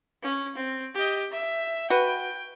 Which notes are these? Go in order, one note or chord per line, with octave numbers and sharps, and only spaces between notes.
C#4
C4
G4 D#5
E5
F#4 B4 G5